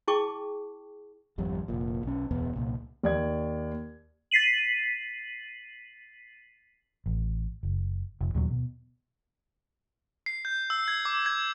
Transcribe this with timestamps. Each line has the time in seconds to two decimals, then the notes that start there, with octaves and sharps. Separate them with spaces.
0.08 E4 G#4 G5 A5 C#6 D6
1.38 G#1 F2 G3
1.68 F1 A#2
2.04 B1 C#4
2.31 D1 E2 B2 B3
2.56 C2 A#2
3.03 D#2 D5 G#6
4.31 A6 B6 C7 D#7 F#7
7.06 A1
7.63 F#1
8.21 F1
8.35 D#2 A#2 F#3
8.51 B2
10.26 C7
10.45 G6
10.70 E6
10.88 G#6
11.05 D6
11.26 G#6